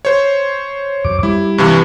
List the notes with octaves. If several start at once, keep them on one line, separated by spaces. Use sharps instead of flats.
C5 C#5
F#2 D6
G3 E4
G2 C3 E3